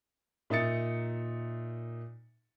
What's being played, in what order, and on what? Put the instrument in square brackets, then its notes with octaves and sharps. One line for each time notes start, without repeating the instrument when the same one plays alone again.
[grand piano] A#2 D#4 E5 D#6 A6 C#7